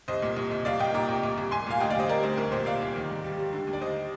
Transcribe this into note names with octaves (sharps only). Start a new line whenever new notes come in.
C2 C5 D#5
A#2
C2
C2
C2 D5 F5
A#2 D#5 G5
A#2 A#5 D6
C2
C2
C2
C2 G#5 C6
A#2 F5 G#5
D2 D#5 G5
D5 F5
G3 C5 D#5
C3 A#4 D5
D2 C5
C2 A#4
A#2 C5
C2 D5 F5
C2
D#3
G#2
G3
G3
D3
D#2
D5
D#2 C5 D#5